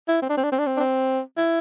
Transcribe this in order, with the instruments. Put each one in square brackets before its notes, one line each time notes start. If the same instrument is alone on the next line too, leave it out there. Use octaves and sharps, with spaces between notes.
[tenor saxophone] E4
C4
D4
C4
D4
C4
D4
C4
D4
C4
E4